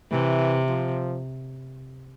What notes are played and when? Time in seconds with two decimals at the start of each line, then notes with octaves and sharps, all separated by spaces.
0.11 C3 E3
0.69 F3